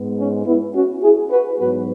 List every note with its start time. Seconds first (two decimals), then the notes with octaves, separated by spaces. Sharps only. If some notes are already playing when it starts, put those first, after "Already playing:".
Already playing: G#2 G#3 B3
0.17 C#4
0.45 B3 E4
0.74 C#4 F#4
1.02 E4 G#4
1.30 F#4 B4
1.59 G#2 F#3 B3 F#4 B4